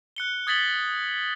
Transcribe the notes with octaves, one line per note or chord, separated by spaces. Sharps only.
F#6 C#7 G7
D#6 G#6 A6 B6 F#7 G7